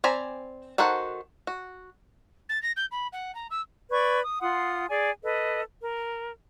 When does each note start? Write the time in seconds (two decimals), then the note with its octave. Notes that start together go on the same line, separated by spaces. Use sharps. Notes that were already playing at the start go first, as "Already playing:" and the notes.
0.04 C4 D5 G#5 A#5 B5
0.78 D#3 F#4 A4 C5 F#5
1.47 F#4
2.49 A6
2.63 A#6
2.77 G6
2.91 B5
3.13 F#5
3.35 A#5
3.51 E6
3.91 B4 D5 C#6 G#6
4.23 D#6
4.41 F4 F#5 C6 D#6
4.90 G#4 D5 G#5
5.23 A4 B4 D#5
5.83 A#4